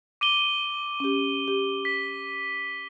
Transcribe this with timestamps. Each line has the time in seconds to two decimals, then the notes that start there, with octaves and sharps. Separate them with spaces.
0.21 D6 D#7 G7
1.00 C#4 G4
1.48 G4
1.85 B6